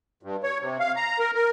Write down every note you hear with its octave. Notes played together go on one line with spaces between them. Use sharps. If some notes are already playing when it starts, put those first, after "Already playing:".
G2
C#5
C3
F5
A#5
A#4
A#4